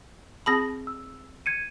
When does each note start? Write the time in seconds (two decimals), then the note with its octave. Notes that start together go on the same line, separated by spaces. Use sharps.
0.46 C4 G#4 A5 B5 D#6 A#6
0.87 E6
1.46 G#6 C#7 D#7